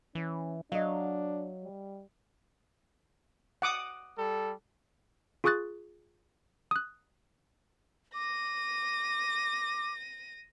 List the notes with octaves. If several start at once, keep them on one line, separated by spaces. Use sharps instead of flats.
E3 C#4
F#3 D4 D#5 F5
G3
F#5 D6 D#6
G3 A4
F4 G#4 C#6 D#6 F#6 A6
D#6 F#6
D6 A#6 D#7